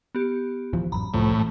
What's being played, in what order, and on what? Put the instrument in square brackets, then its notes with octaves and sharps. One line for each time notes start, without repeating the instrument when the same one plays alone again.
[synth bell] B3 G4
[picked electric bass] D1 E3 F3
[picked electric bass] A1 F#2 [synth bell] A#5 B5
[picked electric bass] C2 F#2 F3 [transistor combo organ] A2
[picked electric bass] A1